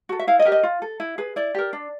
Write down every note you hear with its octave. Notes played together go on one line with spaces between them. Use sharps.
F#4 A4
E5
E4 F5
D#5
G4 A#4
D#5
F4
A4
E4
G#4 B4
E4 D5
G4 A#4
D4